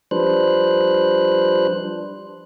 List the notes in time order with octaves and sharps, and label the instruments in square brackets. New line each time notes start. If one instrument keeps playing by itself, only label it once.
[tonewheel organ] F3 G3 D4 B4 C5 F#6